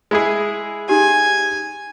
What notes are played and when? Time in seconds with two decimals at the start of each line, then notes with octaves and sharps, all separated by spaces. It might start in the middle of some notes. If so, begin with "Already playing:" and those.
0.11 G#3 E4 G#4
0.89 D#4 G4 G#5